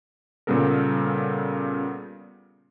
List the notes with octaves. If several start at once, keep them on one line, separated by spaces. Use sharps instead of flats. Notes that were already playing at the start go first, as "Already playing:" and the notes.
A#2 C#3 G3 B3 A4 A#4